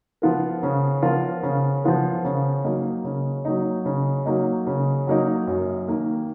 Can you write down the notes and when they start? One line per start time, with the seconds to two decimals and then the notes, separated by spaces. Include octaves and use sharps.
0.22 F3 B3 F4 A#4
0.63 C#3
1.02 F3 B3 F4 A#4
1.43 C#3
1.84 F3 B3 F4 A#4
2.25 C#3
2.64 F#3 A#3 D#4
3.04 C#3
3.45 F#3 A#3 D#4
3.85 C#3
4.26 F#3 A#3 D#4
4.67 C#3
5.07 F#3 A#3 D#4
5.47 F#2
5.88 D#3 A#3